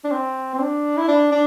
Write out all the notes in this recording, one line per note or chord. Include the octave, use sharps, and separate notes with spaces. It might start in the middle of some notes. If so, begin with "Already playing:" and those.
D4
C4
C4
D4
E4
D4
D4